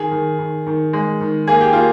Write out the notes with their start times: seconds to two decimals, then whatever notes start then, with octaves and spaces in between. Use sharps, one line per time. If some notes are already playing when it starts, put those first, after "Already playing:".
Already playing: D#3 G#4
0.11 D#3
0.39 D#3
0.67 D#3
0.93 G#3
1.20 D#3
1.47 A#3 G#4
1.61 G4
1.73 A#3 F4